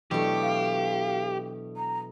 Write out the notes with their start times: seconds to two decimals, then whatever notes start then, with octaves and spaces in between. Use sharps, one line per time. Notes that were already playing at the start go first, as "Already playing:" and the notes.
0.11 B2 E3 F#3 A3 D4 G4
0.42 F5
1.77 A#5